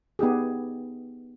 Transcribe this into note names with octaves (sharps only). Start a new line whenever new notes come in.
B3 D#4 G4 G#4